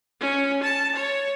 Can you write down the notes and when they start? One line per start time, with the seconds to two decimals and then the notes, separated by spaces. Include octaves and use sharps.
0.20 C#4
0.63 A5
0.95 C#5